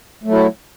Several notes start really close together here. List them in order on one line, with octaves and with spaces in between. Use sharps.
A3 F#3 E4